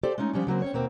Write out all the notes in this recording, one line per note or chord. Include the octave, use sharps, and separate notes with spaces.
G4 A4 C5 D5
G#3 A3 C#4 D#4
F3 G3 C#4 D4
C#3 F#3 A#3 C4
C4 C#4 C#5
D#2 B2 A#3 C4